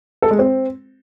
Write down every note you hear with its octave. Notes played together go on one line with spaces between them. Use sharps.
A4
G#3
C4